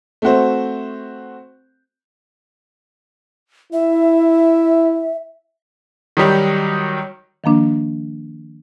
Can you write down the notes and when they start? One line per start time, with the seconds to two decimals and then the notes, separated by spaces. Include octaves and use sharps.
0.22 A3 C4 F#4 C5
3.73 E4 E5
6.17 D#3 F#3 G3 G4
7.44 D#3 F3 A#3 D4